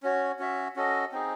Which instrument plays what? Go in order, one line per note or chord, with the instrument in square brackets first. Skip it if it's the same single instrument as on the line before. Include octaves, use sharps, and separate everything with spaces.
[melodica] C#4 F#4 C#5
C#4 F#4 C#5 E5
C#4 F#4 A4 D#5
C4 D#4 G#4